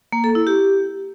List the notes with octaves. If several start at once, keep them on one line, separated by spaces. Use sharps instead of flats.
A#3
A4
E4
G4